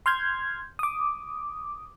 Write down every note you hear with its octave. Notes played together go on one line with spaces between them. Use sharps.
C6 F6 G6 G#6
D6 D#6